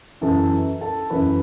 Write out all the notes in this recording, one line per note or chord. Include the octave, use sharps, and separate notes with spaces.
F#2 E3 A4 A5
A4 A5
F#2 E3 B4 B5